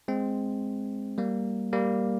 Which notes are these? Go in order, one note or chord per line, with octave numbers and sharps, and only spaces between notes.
G#3 C4
G3 A#3
G3 A#3